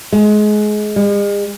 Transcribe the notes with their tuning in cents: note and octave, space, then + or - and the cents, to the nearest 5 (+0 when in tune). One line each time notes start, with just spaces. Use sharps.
G#3 +25
G#3 -45